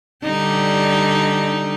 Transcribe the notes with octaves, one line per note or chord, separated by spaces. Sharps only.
D3 G3 D#4